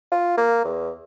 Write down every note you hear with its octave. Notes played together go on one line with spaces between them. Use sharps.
F4
A#3
E2